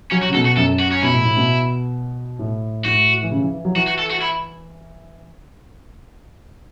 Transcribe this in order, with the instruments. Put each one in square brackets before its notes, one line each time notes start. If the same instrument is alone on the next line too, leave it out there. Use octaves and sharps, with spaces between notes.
[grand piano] F#3 [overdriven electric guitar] C#4
[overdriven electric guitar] F#4
[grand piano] C#3
[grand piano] B2 [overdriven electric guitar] A4
[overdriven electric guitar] F#4
[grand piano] F#2 [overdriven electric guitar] A4
[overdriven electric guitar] F#4
C#4
[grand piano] B2 [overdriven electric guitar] E4
[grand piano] A2
A2
B2
A2
[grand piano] A2 [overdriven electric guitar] F#4
[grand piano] E3
C#3
E3
E3
F#3
[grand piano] E3 [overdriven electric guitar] F#4
[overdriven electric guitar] F#4
A4
F#4
E4